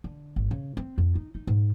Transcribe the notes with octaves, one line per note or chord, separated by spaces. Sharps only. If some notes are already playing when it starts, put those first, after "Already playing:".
D3
G#1
C#3
C4
F2
D#4
D#4
G#2